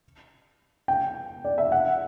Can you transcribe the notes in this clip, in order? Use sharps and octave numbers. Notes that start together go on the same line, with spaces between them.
G5
D5
E5
F#5